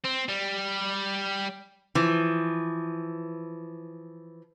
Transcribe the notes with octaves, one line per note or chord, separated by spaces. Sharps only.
C4
G3
E3 F3